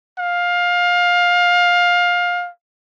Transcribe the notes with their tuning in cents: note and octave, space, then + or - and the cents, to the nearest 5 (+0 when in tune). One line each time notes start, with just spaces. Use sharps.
F5 +20